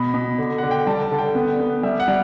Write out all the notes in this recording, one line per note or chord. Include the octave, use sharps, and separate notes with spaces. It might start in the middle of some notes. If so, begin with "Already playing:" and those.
Already playing: B2 B5
B2
D3
D3 F#5
G5
G3 A5
A5
D3
G5
B3
B3
G3 E5
F#5
G3